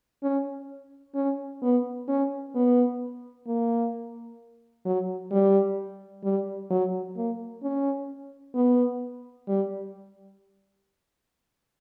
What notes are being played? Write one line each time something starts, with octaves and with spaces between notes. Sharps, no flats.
C#4
C#4
B3
C#4
B3
A#3
F#3
G3
G3
F#3
A#3
C#4
B3
G3